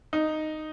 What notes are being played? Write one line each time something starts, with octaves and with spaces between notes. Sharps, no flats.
D#4